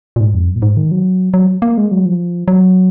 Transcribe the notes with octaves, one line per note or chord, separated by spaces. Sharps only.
A#2
G#2
F2
F#2
A#2
G#2
D#3
F#3
F#3
A#3
G#3
F#3
F3
F#3